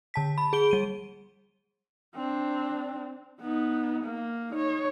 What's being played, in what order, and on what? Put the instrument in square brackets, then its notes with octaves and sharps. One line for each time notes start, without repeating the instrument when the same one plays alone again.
[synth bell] D3 A5 B6
B5
G#4 D7 G7
G3 D#7
[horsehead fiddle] C4 D4
B3 D#4
A#3
D#4 C#5